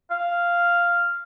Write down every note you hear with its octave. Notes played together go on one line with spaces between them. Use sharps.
F5